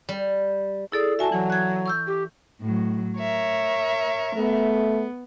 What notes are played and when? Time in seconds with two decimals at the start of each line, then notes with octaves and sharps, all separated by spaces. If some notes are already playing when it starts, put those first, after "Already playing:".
0.09 G3
0.92 E4 G#4 A4 D5
1.19 F#4 E5 G#5 A5
1.32 E3 F#3
1.50 F#6 G#6
1.86 C#6 E6 G6
2.07 G4
2.61 A2 F#3
3.19 A#4 C#5 E5
4.37 A3 B3